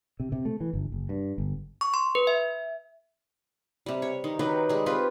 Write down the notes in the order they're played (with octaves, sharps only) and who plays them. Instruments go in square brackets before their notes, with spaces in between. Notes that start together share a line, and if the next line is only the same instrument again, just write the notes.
[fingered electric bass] C3
C3
A3
E3
G1
F#1
G2
G1
[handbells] C#6
C6
B4
E5
[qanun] C3 G3
C#5
D#3
D#3 F#3 G4 B4
G3 G#3
C4 F4 G4 B4